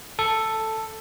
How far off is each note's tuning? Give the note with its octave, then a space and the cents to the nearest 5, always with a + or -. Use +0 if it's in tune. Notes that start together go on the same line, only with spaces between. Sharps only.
A4 +5